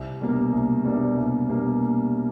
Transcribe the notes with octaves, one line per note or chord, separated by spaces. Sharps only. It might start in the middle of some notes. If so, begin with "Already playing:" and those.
Already playing: C2
B2 G3 A#3 D4
C2
B2 G3 A#3 D4
C2
B2 G3 A#3 D4